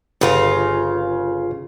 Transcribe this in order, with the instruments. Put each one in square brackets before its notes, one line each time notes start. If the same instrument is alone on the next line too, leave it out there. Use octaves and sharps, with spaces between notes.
[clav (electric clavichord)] G1 [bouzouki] C#3 F4 A#5